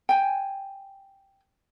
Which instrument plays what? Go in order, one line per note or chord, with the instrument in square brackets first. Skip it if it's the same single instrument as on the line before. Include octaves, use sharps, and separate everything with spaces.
[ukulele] G5 G#5